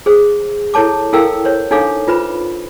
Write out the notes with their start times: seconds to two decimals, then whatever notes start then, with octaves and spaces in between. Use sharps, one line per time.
0.06 G#4 C5
0.74 E4 A4 C#5 A5 D6
1.13 E4 A4 A#4 F5 G5 E6
1.45 C5 C#5
1.71 D4 D#4 A4 C#5 F5 D6
2.08 F4 B4 C5 B5